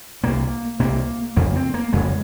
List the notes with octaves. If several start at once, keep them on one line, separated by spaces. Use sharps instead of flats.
C2 C3 A#3
C2 C3 A#3
F2 C#3 A#3
C4
A#3
F2 C#3 G#3